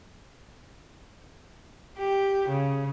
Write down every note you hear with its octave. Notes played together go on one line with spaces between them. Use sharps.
G4
C#3